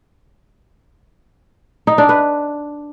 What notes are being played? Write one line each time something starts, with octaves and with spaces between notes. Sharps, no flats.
D#4
D4
B4